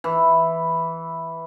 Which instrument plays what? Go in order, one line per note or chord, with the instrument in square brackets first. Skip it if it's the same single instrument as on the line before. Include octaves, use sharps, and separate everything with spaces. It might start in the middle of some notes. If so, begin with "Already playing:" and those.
[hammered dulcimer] E3